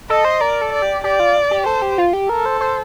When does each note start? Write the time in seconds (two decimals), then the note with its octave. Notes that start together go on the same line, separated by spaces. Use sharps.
0.10 A4 D#5
0.25 C5
0.40 A#4 D5
0.62 A4
0.72 D5
0.82 G4
1.04 G4 D5
1.20 F4
1.51 G4
1.66 A4 C5
1.82 G4
1.98 F4
2.13 G4
2.29 A4 A#4
2.46 C5
2.61 C5